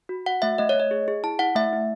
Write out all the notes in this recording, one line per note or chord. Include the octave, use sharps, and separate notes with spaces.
F#4
F#4 F#5
A3 E5
A3 D#5
C#5
A3
D#5
G#4
G#4
E4 A5
E4 F#5
A3 E5
E4